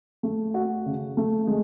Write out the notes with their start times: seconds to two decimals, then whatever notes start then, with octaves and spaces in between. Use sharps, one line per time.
0.23 A3
0.54 F#4
0.86 C#3
1.17 A3
1.47 G#3